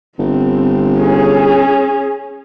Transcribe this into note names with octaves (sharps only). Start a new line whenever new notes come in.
G1 C4
C#4 G#4